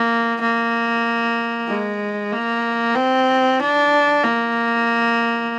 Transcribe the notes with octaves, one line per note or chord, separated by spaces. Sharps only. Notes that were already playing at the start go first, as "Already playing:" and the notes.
Already playing: A#3
A#3
G#3
A#3
C4
D4
A#3